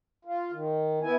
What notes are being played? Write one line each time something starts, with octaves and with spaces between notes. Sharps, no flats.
F4
D#3
B3 E4 G#5